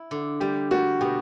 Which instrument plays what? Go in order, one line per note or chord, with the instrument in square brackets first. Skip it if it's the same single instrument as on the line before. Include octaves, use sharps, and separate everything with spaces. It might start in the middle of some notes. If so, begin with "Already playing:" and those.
Already playing: [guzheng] E4
D3
[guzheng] G3 [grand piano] G4
[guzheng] G3 [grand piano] F#4
[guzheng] B2 [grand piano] G4